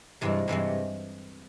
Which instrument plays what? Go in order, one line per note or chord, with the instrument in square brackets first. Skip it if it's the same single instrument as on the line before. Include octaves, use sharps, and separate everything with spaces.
[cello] G2 [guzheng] C3 E3 G#3 C4 E4
[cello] G2 [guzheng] C3 E3 G#3 C4 E4